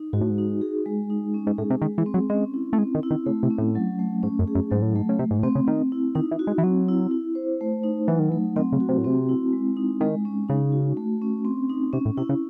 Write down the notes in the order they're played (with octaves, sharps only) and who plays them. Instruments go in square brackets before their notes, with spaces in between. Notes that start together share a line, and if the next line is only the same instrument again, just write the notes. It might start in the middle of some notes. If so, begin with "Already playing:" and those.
Already playing: [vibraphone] D#4
[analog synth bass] G#2 [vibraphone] F#4
[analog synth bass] A2
G#2
[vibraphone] D#4
G#4
G#3
D#4
C#4
[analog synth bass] G#2
[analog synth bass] A2 [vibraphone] G#4
[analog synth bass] C3
[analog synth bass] D#3 [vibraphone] G#3
[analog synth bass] E3
[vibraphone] C4
[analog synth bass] F#3
[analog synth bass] G#3 [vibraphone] C#4
[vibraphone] E4
[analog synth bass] A3
[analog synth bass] G#3 [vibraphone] C4
[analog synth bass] D#3
[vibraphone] E4
[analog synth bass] D#3
[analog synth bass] C#3 [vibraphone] A3
[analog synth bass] C3
[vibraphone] C#4
[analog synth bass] A2
[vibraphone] F#3
A3
[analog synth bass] G#2 [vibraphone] C#4
[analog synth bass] F#2
[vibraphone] G#4
[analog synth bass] F#2
[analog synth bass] G#2 [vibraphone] F#3
[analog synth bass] A2
[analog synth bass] G#2 [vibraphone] A3
[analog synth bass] C#3
[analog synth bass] C3 [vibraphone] A3
[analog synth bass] G#2
A2
[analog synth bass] C3 [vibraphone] C4
[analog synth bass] C#3
[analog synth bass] D#3 [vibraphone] C4
[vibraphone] E4
[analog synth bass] D#3 [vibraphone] D#4
[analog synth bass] E3
[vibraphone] F#4
[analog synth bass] G#3
E3
[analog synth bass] F#3 [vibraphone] C4
[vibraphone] E4
E4
C5
A3
D#4
[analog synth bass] E3 [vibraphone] F#3
[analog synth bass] D#3
[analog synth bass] E3 [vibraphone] A3
[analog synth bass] D#3 [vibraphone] C4
[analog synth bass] C#3
[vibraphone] F#4
[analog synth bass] C3
A2
[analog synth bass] C3 [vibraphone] C4
[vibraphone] E4
G#3
D#4
[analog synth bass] D#3 [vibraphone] G#3
[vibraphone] C#4
[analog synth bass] C#3 [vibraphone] D#4
[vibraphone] F#4
A3
C#4
C4
D#4
[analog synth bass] C3 [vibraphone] C#4
[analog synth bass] A2
[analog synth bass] C3 [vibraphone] E4
[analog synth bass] C#3